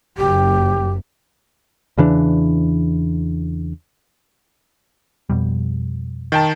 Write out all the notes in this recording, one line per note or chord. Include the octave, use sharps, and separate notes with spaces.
F#1 G4
E2 C#3 E3 D4
F2 B2 G3
D#3 G5 A5